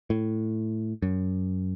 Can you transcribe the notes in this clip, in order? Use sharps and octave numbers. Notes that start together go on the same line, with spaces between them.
A2
F#2